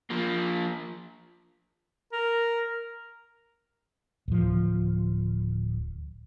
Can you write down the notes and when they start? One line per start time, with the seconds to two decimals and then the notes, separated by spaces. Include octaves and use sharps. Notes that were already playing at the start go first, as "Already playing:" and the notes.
0.10 F3 A#3
2.12 A#4
4.28 D1 F3